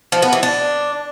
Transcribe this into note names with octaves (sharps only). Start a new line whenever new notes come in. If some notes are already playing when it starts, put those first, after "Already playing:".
F3
B3
E3
D4